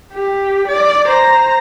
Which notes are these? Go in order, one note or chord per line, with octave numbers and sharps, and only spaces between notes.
G4
D5
C5 A#5